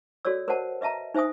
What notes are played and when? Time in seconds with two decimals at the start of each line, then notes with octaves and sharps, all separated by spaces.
0.25 F#4 A4 C#5 D5 E6
0.48 A#4 C5 C#5 D#5 F#5 A5
0.81 B4 D#5 E5 A5 A#5
1.14 D#4 C5 E5 G#5 D#6